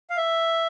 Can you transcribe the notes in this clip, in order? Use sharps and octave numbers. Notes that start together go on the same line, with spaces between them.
F5
E5